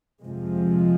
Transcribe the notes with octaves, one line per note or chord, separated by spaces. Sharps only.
F2 C3 F3 G#3